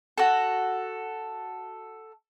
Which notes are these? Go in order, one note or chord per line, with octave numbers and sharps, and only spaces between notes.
F#4 A4